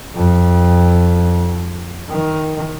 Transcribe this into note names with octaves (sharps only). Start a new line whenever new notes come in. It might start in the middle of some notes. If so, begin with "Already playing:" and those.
F2
D#3